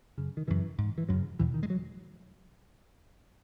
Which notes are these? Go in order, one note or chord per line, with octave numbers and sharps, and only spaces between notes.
F#2 C#3
D#3
F#2 C#3 E3
G#2
E3
F#2 C#3 F#3
E2 B2 E3
D#3
G#3
F#3